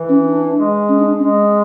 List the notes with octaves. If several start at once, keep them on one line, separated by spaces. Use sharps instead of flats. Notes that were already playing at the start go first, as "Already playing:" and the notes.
Already playing: E3
C#4
D4
G#3
C#4
D4
G#3 C#4